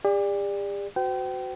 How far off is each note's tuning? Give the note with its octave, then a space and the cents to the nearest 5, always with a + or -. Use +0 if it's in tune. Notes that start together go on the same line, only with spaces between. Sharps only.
G4 +45 D5 +5
F#4 +0 C5 -40 G5 -30